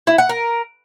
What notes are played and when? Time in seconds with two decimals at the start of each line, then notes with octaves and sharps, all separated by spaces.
0.07 E4
0.18 F#5
0.29 A#4